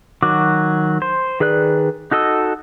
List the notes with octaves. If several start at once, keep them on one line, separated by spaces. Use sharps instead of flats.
D#3 F#3 F#4 D6
C5
D#3 G#4 B4 D5 F#6
D#4 F#4 A4 D#5 E6